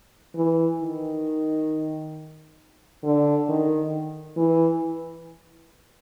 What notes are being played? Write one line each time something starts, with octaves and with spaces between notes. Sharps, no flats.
E3
D#3
D3
D#3
E3